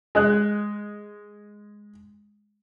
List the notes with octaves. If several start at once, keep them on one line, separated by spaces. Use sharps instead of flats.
G#3 D#5 F#6